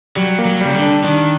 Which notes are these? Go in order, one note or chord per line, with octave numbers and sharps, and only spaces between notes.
F#3 G3
A#3
F#3
C#3 G3
D3
D4
D#3 D4